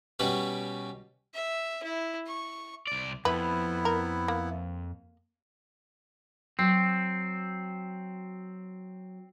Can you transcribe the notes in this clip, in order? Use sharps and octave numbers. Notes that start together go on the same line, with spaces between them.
B2 G3 C#4 G4 B4
E5
E4
C#6
C2 D5
F2 B3 E4 B4
A#4
A#3
F#3 C4